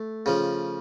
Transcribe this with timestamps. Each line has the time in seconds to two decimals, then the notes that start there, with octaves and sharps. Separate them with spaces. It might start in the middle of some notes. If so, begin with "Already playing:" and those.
Already playing: A3
0.26 C#3 F3